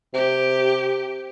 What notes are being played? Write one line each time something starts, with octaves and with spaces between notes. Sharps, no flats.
C3 G4